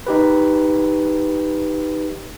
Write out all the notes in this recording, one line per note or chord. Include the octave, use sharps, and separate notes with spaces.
D#4 G4 B4